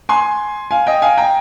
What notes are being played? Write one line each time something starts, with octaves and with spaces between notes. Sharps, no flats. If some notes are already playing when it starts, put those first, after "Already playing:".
G#5 C6
F5 G#5
D#5 G5
F5 G#5
G5 A#5